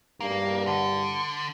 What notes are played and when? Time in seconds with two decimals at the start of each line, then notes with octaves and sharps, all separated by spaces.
0.21 G2 A#3
0.67 D3 F#5 A5